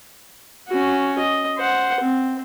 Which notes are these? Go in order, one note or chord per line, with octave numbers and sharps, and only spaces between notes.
C#4 F#4
D#5
C5 F#5
C4